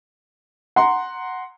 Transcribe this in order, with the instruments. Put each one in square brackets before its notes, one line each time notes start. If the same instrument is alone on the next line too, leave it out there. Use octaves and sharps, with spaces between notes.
[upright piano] F#5 A#5 C6